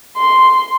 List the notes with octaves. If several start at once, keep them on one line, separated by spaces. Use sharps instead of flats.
C6